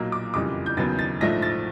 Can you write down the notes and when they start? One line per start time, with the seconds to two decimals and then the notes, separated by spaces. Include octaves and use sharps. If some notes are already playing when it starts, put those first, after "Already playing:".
Already playing: B1 A#2 F#3 A#3
0.12 D6
0.34 F#1 F2 C#3 E3 G3 D6
0.66 G6
0.77 D#2 C#3 F#3 B3 A6
0.99 A6
1.20 A#1 G#2 F3 A3 A#6
1.42 A6